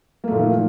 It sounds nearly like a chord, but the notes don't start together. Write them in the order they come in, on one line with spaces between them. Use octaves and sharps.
A#3 A3 A#2 F3 D#3